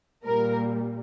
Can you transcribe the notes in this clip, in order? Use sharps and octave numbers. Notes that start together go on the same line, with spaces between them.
A#2 G3 A#3 A#4